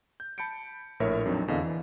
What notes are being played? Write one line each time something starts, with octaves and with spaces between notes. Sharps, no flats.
G6
A5 B5 G6 C#7 D7
A#1 A2 A#4 C#5 E5
F2 F#3 C4 D4 D#4
E2 D3 B3 D#5 F5
E3